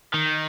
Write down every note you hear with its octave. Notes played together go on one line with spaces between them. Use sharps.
D#3